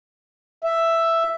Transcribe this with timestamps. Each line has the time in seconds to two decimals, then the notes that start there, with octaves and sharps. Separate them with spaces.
0.64 E5